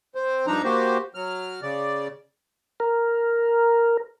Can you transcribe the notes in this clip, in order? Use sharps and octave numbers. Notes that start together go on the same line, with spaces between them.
C4 C5
G2 F3 D4 D#4 A#5
A#3 F#4 G4 C5
F#3 F6
C#3 D5
A#4